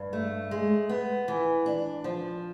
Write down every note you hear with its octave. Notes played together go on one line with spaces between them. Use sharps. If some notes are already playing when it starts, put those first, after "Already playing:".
Already playing: G2
A3
G#3
B3
E3
D4
F3